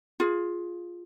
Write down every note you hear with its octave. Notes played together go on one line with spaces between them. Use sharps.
F4 G#4